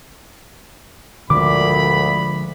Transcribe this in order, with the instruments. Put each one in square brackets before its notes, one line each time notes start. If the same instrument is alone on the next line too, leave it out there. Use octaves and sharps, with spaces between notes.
[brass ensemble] D2 A#2 [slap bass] D3 F3 G#3 [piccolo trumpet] B5 [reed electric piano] D6